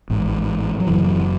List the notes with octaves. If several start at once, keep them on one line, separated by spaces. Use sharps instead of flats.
A1 G#2
F#3
F#1 F#2 C#3 E3
E3